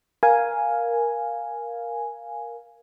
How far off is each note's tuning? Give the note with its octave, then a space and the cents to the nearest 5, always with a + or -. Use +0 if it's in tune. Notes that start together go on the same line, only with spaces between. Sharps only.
A#4 +10 F5 +0 G#5 +0